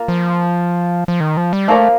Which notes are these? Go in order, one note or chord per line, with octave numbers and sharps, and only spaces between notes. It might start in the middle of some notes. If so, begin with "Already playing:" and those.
Already playing: A#3 F4 A#4
F3
F3
D#3
F3
G3
F3 A3 A#3 F4 A#4 D5